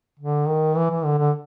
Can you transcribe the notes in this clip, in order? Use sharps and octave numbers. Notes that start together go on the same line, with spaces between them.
D3
D#3
E3
E3
D3
D3